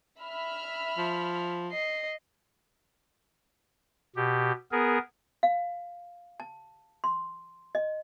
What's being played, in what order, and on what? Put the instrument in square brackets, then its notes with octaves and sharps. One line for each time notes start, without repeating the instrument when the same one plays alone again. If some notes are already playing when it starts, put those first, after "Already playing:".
[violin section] E5 B5 F6
[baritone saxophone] F3
[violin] D#5 C7
[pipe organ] B2 G4
B3 G#4 A#4
[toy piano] F5
A5
C6
D#5